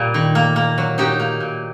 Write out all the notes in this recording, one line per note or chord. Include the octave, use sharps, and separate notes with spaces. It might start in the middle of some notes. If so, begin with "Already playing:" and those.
Already playing: A#2 G3 A#3
D#3
A#3
A#3
F#3
F#3 D#4 G4
A#3
A#2